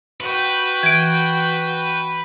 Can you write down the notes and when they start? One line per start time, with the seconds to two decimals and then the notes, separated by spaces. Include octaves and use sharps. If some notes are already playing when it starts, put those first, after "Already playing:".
0.21 F#4 B4 G5
0.83 E3 G#6 D7